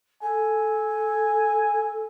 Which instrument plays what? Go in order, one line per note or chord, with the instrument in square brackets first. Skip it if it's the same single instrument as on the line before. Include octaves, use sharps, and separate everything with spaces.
[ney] A4 [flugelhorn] G#5